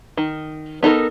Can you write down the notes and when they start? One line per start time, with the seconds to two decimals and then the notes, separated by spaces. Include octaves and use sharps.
0.17 D#3
0.83 B3 D#4 A4 A#4